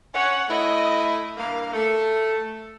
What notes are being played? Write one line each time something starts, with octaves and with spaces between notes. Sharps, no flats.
C#4 C#5 F#5
A3 E4 D#5
G2 A#3 F5
A3 A4